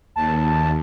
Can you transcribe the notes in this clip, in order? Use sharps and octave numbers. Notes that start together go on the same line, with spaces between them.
D#2 A5